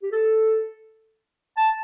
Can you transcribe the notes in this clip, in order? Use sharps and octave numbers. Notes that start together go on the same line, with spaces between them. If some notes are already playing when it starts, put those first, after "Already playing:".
G4
A4
A5